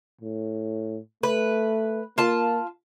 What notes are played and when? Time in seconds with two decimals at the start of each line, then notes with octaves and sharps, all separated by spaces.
0.21 A2
1.23 A3 B4
2.18 A#3 F4 A5